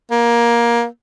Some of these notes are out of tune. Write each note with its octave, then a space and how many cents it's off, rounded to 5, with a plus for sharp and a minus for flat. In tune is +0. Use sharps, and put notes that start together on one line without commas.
A#3 +15